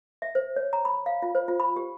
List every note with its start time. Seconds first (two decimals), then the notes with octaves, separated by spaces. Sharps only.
0.22 E5
0.35 C5
0.56 C#5
0.73 A#5
0.85 B5
1.06 F5
1.22 F4
1.35 C5
1.48 F4
1.60 B5
1.76 G4